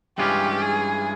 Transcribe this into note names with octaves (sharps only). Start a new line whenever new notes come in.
G2 E3 G#3 C#4 F4 G4
G#4